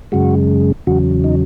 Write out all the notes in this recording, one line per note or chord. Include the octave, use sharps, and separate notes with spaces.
F#2 C#3 G#3 F#4
E2 C#3 F#3 F#4
D#4